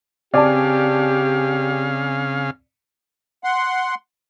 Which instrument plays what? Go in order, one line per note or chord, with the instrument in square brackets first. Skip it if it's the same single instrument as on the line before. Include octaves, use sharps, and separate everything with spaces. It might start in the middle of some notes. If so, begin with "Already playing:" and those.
[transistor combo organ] C#3 F5 [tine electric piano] C4 G#5 D6 [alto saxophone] G4 [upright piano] D5 A5
[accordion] F#5 C6